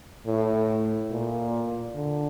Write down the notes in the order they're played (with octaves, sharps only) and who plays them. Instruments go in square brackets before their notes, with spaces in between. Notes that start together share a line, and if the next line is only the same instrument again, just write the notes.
[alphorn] A2
A#2
D3